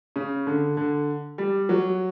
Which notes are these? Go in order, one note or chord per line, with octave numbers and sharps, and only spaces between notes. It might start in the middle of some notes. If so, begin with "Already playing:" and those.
C#3
D3
D3
G3
F#3